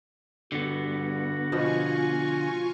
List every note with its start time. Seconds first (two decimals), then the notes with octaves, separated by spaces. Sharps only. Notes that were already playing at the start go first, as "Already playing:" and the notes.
0.52 G2 D3 B3 F#4
1.52 B2 F3 F4 G#5 C#6